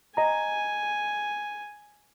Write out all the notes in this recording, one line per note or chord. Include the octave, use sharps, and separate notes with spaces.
D#5 G#5 A#5